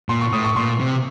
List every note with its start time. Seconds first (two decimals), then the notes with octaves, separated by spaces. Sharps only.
0.09 A#2 C6
0.21 C#6
0.32 A2 D#6
0.44 C#6
0.56 A#2 C6
0.80 C3